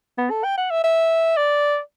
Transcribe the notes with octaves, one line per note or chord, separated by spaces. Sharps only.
B3
A4
G5
F#5
E5
E5
D5